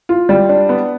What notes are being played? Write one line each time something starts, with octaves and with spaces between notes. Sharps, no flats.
F4
G3
D4
B3